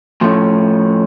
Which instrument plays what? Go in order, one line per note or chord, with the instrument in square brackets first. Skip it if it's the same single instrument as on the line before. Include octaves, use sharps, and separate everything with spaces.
[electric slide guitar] A2 F3 A3 C#4